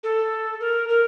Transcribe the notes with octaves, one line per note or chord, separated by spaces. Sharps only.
A4
A#4
A#4